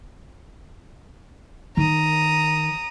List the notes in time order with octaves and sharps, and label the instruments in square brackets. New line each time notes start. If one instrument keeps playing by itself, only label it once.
[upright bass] D#3 [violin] A#5 D#6